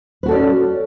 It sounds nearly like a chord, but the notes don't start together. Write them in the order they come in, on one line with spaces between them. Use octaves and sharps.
B4 F#4 A4 D5 C#4